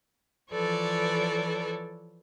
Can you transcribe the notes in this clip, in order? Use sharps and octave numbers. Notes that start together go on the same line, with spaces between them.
E3 F3 A4 B4 C#5 D5